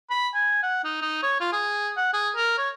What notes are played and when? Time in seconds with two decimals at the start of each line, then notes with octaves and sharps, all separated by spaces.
0.10 B5
0.34 G#5
0.63 F#5
0.84 D#4
1.02 D#4
1.23 C#5
1.40 F4
1.53 G#4
1.97 F#5
2.13 G#4
2.36 A#4
2.58 C#5